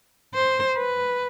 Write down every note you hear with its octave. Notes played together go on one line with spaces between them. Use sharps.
C5
B4